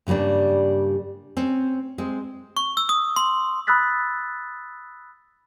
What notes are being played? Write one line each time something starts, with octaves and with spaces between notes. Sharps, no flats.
G2 C#3 G3 A#3 D4
C4 C#4
G#3 C4
C#6
E6
D#6
C6
B5 D#6 E6 F#6 A6 B6